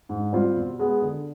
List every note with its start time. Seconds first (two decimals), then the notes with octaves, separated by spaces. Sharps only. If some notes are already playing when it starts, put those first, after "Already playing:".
0.09 G#2
0.33 G3 C4 F4
0.56 B2
0.79 G#3 B3
1.02 D3